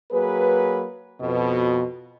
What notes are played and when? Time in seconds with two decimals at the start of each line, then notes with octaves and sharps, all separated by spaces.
0.12 F#3 A#3 G#4 B4
1.21 F2 B2